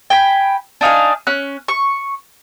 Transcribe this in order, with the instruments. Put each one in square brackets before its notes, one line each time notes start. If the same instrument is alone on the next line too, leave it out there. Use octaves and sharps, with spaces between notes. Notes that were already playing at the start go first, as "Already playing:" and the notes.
[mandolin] G5 G#5 B5
D4 D#4 F5 G#5
C#4 F#6
C#6